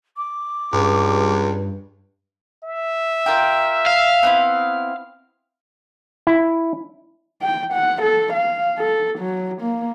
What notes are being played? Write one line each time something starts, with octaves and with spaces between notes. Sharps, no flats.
D6
C#2 G2
E5
F4 A#4 G5
F5
B3 C4 E4
E4
G5
F#5
A4
F5
A4
F#3
A#3